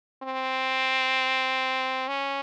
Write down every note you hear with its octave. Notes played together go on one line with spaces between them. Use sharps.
C4
C#4